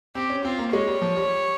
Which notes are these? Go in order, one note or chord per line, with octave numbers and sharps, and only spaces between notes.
C4 G4
C#4
C4 F4
A#3
G#3 C#5
G3
F3
G3